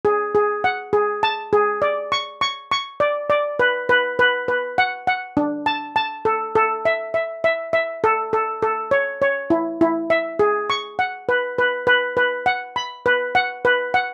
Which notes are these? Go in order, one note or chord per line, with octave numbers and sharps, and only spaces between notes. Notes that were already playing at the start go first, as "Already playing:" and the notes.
G#4
G#4
F#5
G#4
A5
G#4
D5
C#6
C#6
C#6
D5
D5
B4
B4
B4
B4
F#5
F#5
D4
A5
A5
A4
A4
E5
E5
E5
E5
A4
A4
A4
C#5
C#5
E4
E4
E5
G#4
C#6
F#5
B4
B4
B4
B4
F#5
B5
B4
F#5
B4
F#5